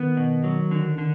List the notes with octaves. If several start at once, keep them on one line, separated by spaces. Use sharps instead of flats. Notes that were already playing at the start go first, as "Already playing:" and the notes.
Already playing: D#3 B3
B2
F#3
D3
D3